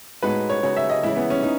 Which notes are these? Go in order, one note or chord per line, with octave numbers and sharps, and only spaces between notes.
A2 G#3 B3 D#4 F#4 B4
C#5
C#3 G#3 D#4 F#4 C#5
E5
D#5
C#3 E3 G#3 E4
B3
C#4
D#4